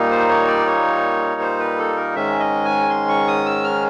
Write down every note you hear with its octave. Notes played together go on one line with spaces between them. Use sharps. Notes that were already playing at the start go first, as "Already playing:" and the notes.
Already playing: A#2 G3 A#3 D#4
C5
C#5
D5
C#5
C5
B4
A4
A#4
G#2 D#3 G#3 C#4 E5
D#5
G#5
C6
C#6
D#6
E6
F6